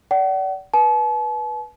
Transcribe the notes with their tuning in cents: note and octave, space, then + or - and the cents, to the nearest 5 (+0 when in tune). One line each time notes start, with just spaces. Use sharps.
D5 -30 F#5 +40
B4 -20 A5 -40